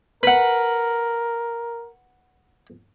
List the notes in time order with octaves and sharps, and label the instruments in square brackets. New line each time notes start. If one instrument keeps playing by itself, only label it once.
[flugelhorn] A#4 [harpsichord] B4 F#5